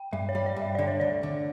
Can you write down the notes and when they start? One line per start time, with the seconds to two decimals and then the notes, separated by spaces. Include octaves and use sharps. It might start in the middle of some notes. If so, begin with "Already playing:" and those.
Already playing: G5
0.13 G2 E5
0.29 C#5
0.35 G3
0.46 D5
0.56 G2
0.62 E5
0.75 D3 D5
0.88 C#5
1.00 D2 D5
1.23 D3